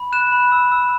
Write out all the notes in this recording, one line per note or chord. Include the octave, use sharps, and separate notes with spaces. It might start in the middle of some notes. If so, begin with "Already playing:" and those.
Already playing: B5
F#6 E7
B5
E6
E6